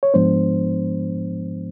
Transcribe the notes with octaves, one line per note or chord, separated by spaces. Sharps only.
C#5
G#2 F3 G#3 B3 D4 C5